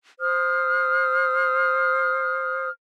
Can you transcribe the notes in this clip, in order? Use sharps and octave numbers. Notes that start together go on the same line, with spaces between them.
C5 D#6 F6